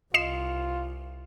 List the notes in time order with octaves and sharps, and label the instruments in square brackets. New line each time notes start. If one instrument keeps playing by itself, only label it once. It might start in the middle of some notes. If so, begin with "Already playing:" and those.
[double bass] C2 [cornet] F4 [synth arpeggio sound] D#5 C7 E7